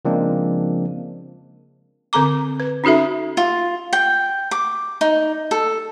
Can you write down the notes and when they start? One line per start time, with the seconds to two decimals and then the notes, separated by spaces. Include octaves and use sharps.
0.05 C#3 F3 G#3 A#3 C4 D4
2.13 D3 C4 A4 A#5 D6
2.60 B4
2.84 C#4 D#4 F#4 A4 E5
3.37 F4
3.93 G5
4.51 D6
5.01 D#4
5.51 A4